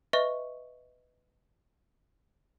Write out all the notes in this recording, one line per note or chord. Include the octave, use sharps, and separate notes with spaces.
B4 D#5 E5 C#6